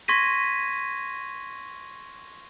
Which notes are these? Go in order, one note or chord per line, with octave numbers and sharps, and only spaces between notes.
C6 C#6 G#6 A#6 B6 D#7